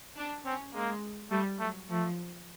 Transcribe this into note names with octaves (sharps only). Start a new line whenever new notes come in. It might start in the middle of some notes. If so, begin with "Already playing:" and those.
D4
C4 C#4
G#3 A#3
G3 A3
F#3 A3
F3 A3